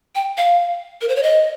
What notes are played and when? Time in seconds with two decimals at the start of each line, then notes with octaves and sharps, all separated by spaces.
0.15 G5
0.37 F5
1.01 A#4
1.09 C5
1.16 C#5
1.23 D#5